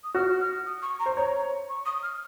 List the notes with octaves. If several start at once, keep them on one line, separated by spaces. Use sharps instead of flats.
D#6
F#4 F6
F6
D#6
C#6
A#5
C5
C#5 A#5
C#6
D#6
F6